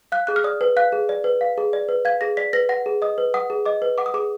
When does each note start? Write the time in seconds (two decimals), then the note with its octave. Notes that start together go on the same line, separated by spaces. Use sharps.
0.12 F5 F#6
0.27 G#4 F#6
0.36 F6
0.44 D5 D#6
0.61 B4
0.77 F5 F#6
0.92 G#4
1.09 D5
1.24 B4
1.41 F5
1.58 G#4
1.73 D5
1.89 B4
2.05 F5 G#6
2.21 G#4 A#6
2.37 D5 B6
2.53 B4 A#6
2.69 F#5 A#6
2.86 G#4
3.02 D#5 D#6
3.18 B4
3.34 F#5 D#6
3.50 G#4
3.65 D#5 D6
3.82 B4
3.98 F#5 D6
4.06 D#6
4.14 G#4 D6